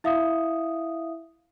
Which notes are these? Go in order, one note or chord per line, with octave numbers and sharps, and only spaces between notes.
E4 E5 F5 D#6